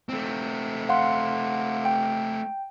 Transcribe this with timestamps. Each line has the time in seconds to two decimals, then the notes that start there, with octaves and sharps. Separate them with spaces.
0.09 A3 C4
0.89 F5 F#5 C6
1.85 G5